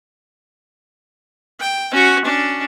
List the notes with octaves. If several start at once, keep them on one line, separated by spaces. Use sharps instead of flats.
G5
C#4 F#4
C#4 D4